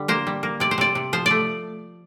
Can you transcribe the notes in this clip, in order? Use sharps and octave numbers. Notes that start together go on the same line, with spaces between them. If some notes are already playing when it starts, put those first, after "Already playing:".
Already playing: D3 G3
A#3 C5
G3
A#3
C3 D5
C5
C3 D5
C3
F3 C5
A3 D5